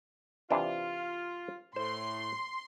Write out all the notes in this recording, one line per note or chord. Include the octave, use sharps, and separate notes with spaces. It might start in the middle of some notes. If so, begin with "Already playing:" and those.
C3 E3 D4 F4
A2 C5 C6